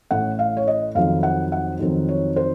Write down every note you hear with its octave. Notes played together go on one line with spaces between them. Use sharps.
A1 A2 A3 C#4 F#5
F5
C#5
D#5
F2 D#3 F#3 C4 F5
F#5
F#5
F2 D#3 F#3 C4
C#5
C5